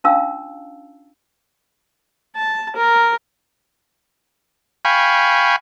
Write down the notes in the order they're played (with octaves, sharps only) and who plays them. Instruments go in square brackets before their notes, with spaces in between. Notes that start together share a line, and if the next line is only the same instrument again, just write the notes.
[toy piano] C#4 D4 F4 F5 A5 E6
[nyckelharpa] A5
A#4
[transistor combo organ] F5 G5 G#5 B5 C#6